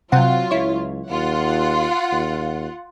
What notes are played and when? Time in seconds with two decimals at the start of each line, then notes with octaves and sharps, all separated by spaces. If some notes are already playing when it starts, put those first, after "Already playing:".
0.12 C3 F#3 C4 F4 F#5
0.51 C#2 E4 C#5
1.10 D#2 F4 F#5
2.12 D#2